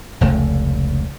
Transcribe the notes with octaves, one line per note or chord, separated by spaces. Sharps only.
F1 C#2 A3